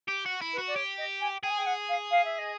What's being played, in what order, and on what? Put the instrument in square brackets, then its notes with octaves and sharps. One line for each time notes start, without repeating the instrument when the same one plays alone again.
[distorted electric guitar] G4
F#4
E4
[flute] B4
[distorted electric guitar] F#4
[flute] D5
[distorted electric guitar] G4 [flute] C#5
[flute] D#5
G#5
[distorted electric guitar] G#4 [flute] G5
[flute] G#5
G5
F#5
F5
F5
E5
D#5